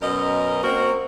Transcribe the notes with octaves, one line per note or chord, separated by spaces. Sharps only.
F#2 B2 A#4 D#5
A#3 C4 F#4 A#4